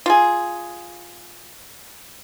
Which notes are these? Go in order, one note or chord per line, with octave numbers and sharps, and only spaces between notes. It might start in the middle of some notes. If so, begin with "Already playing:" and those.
F4 G#4